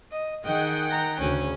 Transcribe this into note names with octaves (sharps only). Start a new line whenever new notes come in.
D#5
D#3 G#4 D#5 F#5 G5
A#5
D2 C#3 C#4